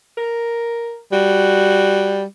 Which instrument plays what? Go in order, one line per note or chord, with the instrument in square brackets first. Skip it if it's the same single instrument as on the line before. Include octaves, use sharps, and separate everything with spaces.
[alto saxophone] A#4
[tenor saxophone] G3 [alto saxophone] F#4